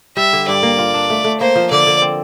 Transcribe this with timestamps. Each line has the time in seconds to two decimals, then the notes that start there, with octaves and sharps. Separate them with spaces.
0.17 G3 E5
0.33 D3
0.48 G2 D5
0.63 A#3
0.79 F4
0.94 D4
1.10 A3
1.25 A3
1.40 A#3 C5
1.56 F3
1.71 D3 D5
1.87 D3
2.02 C4